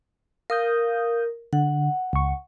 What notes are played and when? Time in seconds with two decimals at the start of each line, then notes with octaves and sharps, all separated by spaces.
0.50 A#4 F5 D#6 G6
1.53 D3 F#5
2.13 C#2 C#6